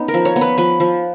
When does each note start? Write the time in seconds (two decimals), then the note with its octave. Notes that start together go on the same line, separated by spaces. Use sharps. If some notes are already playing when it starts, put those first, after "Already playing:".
Already playing: B3 C#4 D#4
0.08 A#4
0.14 F3
0.25 C#5
0.36 B3
0.41 B4
0.57 F3 B4
0.80 F3